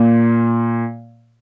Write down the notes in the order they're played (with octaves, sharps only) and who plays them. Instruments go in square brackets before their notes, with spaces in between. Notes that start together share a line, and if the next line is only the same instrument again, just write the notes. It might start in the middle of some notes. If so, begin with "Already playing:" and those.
Already playing: [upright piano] A#2